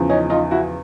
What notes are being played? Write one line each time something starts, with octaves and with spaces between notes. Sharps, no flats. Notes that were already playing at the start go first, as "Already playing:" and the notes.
Already playing: E2 C#3 F3
C#4 D#4
D#4 F4
E4 F#4